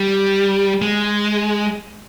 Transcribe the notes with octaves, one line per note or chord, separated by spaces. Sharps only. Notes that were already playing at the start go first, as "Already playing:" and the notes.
Already playing: G3
G#3